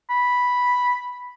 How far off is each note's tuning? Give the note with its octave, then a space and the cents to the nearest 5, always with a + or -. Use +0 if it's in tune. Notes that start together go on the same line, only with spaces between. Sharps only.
B5 -5